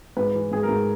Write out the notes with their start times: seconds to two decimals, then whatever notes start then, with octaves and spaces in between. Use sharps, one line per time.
0.17 G#2 B4
0.34 E3
0.51 G#2 G#4
0.63 A#4
0.69 G#2